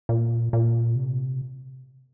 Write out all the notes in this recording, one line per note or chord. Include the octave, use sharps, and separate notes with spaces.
A#2
A#2
C3